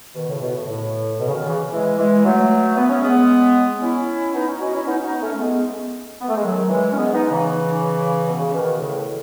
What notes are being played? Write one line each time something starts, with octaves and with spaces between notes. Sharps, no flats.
B2 D#3
A2 C#3
B2
A2
A2
B2
C#3
B2 D#3
C#3 E3
E3 G#3
E3 G#3
F#3 A3
B3
C#4
G#3 B3
C#4 E4
B3 D#4
C#4 E4
D#4 F#4
C#4 E4
B3 D#4
C#4
B3 D#4
A3 C#4
A3
G#3 B3
B3
A3
G#3
D#3 F#3
E3 G#3
C#4
G#3 B3
B3 D#4
C#3 E3
B2
C#3
B2 D#3
A2 C#3